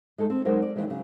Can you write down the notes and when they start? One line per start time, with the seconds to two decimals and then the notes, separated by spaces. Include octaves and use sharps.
0.18 G#3 D#4 A4
0.30 C4
0.45 F#3 G#3 D#4 A#4 C5
0.62 D5
0.76 D#2 B2 E3 G3 G#3
0.88 C#3 F#3